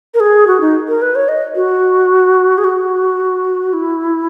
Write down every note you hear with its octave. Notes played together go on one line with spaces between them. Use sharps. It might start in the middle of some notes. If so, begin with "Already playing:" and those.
A#4
G#4
F#4
D#4
A#4
B4
C#5
D#5
F#4
G#4
F#4
E4